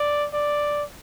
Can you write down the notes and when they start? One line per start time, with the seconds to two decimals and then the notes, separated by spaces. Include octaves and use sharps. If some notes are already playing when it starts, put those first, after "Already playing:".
Already playing: D5
0.33 D5